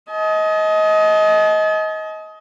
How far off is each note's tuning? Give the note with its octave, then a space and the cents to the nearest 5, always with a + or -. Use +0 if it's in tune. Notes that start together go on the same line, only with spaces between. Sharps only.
D#5 +20 A5 -45